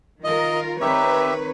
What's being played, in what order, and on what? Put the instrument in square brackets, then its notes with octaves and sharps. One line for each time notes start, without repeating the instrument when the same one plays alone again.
[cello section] D#3 F4 A#4 [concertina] D#5
[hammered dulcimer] D#3 [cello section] C4 B4 C#5 [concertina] G4 E5